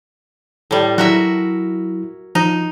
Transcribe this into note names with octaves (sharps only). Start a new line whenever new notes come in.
A2 G3
F#3 E4 F#4 A#4 E5
F3 D#4